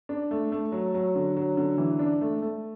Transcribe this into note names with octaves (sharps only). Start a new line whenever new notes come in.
D4
A3
A3
F#3
F#3
D3
F#3
D3
E3
D4
A3
A3